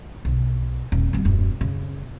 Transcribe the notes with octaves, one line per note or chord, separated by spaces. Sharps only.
B1
D#1
F2 G3
D#1 F#2
C#3